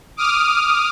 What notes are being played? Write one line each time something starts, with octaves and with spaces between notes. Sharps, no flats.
D6 D#6 F6